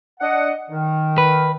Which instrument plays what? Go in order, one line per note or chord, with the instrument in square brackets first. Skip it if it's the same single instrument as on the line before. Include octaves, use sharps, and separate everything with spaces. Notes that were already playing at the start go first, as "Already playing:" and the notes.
[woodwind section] D4 D#5 F#5
D#3
[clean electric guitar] B4